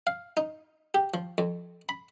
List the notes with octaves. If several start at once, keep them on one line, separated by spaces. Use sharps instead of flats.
F5
D#4
G4
F3
F2
B5